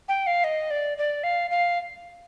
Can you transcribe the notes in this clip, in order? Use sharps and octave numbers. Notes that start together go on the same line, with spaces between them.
G5
F5
D#5
D5
D5
F5
F5